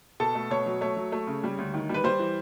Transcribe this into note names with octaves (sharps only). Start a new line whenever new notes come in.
B2 A4
A3
B2 C#5
F#3
A3 C#5
F#3
A3
C#3
G3
D2
D#3
G3
B4
G3 C5
E3